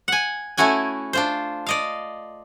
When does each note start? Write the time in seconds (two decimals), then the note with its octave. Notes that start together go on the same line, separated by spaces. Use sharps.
0.08 F#5 G#5
0.57 A3 C#4 E4 F#4 G#5
1.13 D4 F4 C5
1.67 D5 D#5 F5